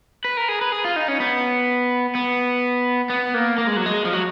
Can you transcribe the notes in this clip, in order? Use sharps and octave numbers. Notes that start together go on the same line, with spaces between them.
B4
A#4
G#4
B4
G#4
F4
D#4
C#4
B3
B3
B3
A#3
A#3
G#3
F#3
G#3
F3
F#3